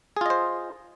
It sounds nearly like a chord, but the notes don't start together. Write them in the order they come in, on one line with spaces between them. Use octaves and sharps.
G#4 F4 D#5 C5